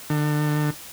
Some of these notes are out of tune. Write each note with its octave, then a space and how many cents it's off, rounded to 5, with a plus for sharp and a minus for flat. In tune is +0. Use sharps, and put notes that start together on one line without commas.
D3 +35